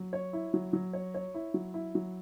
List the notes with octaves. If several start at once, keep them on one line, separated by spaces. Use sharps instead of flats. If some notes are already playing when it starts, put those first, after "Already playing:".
Already playing: F#3
C#5
E4
F#3
F#3
C#5
C#5
E4
F#3
E4
F#3